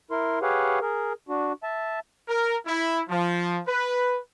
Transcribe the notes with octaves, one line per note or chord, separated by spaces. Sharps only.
E4 A#4 C6
G4 G#4 B4 C#5 F5 F#5
G#4 A#4
D4 F#4
E5 A5
A#4
E4
F3
B4